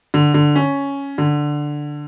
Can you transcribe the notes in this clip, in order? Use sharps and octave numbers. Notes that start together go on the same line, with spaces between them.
D3
D3
C#4
D3